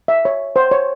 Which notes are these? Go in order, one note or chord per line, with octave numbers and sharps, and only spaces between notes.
E5
C#5
C5
C#5